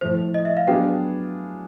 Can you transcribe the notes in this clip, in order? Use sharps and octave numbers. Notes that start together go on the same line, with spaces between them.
A2 F3 A3 C5
D#5
E5
F5
F#3 B3 D4 F4 G#4 G5